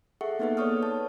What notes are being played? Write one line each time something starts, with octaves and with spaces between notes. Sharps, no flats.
G#4 A4 E5 F#5 C#6
A#3 B3 D#4 A4 B4 F#5
B4 C#5 D5 C#6 D#6 F6
C#5 A5